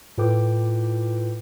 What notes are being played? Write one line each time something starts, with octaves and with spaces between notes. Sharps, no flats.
A2 F4 A4 B4 G5 D6